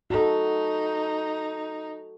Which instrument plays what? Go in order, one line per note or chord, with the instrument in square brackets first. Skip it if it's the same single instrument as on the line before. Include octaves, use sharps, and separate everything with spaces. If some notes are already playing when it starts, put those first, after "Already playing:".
[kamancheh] D#4 [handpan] F#4 A4